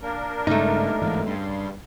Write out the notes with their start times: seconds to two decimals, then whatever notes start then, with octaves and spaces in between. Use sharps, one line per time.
0.01 A#3 D4 A#4
0.47 G2 C#3 G#3 A3 D#4
1.02 G1 G#2 E3
1.26 G2 C#3 G3 C6